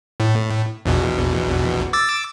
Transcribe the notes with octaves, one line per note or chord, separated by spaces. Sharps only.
A2
A#1 E2 B2
D6 E6 A6